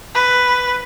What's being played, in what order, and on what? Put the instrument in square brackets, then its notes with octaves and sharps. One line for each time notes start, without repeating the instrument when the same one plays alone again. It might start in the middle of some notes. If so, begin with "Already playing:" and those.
[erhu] B4